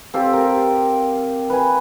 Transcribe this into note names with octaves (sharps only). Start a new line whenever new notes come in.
C4 F4 G4 A4
A#4
B4 G#5